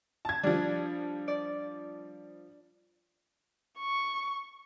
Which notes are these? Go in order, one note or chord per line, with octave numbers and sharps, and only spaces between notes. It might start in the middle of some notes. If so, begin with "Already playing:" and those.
A5 G#6
F3 G3 D4
D5
C#6